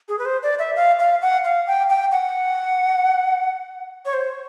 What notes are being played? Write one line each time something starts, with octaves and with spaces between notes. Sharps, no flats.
G#4
B4
C5
D5
E5
F5
F5
F#5
F5
G5
G5
F#5
C#5
C5